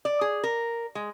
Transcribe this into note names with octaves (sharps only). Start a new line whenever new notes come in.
D5
G#4
A#4
G#3